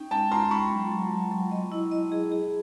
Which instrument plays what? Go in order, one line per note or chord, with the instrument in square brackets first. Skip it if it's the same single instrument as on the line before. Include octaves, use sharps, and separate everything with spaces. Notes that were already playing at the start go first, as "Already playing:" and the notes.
Already playing: [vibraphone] C#4 D#4 [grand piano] G5
[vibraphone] G#3 [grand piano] G5 A5
[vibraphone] F4 [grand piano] A#5 C6
[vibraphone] G#3 [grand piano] B5 C#6
[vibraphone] F#3
F#3
F#3
F#3
D#5
E4
D#5
G#4
G#4